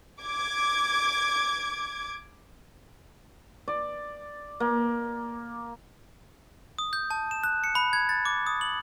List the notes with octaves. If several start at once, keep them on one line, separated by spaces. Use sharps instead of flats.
D6 G#6
D5
A#3
D#6
G6
A5
E7
F#6
C#7
B5
G#6
A6
D6
D#6
F#7